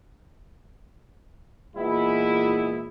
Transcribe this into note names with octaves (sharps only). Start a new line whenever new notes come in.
A#2 E3 G#3 B3 E4